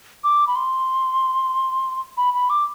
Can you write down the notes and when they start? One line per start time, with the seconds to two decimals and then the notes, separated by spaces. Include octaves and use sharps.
0.24 D6
0.47 B5
0.56 C6
2.17 B5
2.34 B5
2.50 D6